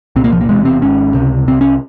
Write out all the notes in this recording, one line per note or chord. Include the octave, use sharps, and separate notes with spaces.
C2 A#2 C4
A#3
F3
A#3
E1 E2 C3 G#3
C4
G#1 G#2 C#4
C#2 C3
C2 C3 C4
C#4